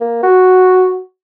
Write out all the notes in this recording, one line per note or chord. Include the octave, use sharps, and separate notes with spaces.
A#3
F#4